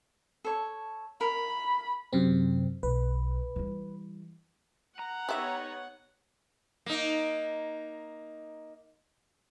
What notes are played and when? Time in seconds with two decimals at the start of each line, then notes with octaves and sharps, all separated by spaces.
0.45 A4 C#5
1.21 A#4 B5
2.13 F#2 C3 C4
2.83 B1 B4
3.56 E3 G3
4.99 F#5 A#5
5.29 B3 D#4 G4 C#5 E5
6.86 A#3 D#4